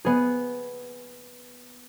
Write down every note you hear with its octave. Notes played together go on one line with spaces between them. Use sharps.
B3 G#4